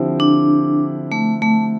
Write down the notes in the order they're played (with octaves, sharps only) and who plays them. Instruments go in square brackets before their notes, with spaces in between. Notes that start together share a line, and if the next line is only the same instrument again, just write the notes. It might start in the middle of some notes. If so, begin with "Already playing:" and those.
Already playing: [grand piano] D3 F3 C4 E4 G4
[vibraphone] D4
A3
A3